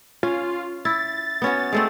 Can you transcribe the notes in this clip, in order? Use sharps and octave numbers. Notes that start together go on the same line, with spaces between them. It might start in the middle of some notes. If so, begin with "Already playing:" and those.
C#4 F4
E4 A6
B3 C#4 F#4
G#3 A3 C4